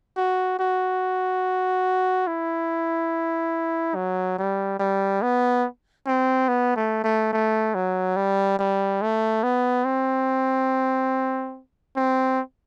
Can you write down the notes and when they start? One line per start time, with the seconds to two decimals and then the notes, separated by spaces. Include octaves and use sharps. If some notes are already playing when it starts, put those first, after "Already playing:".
0.17 F#4
0.59 F#4
2.27 E4
3.95 F#3
4.38 G3
4.79 G3
5.22 B3
6.06 C4
6.49 B3
6.76 A3
7.04 A3
7.33 A3
7.75 F#3
8.16 G3
8.59 G3
9.02 A3
9.43 B3
9.85 C4
11.96 C4